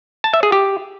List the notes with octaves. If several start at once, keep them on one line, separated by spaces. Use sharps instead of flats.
A5
E5
G#4
G4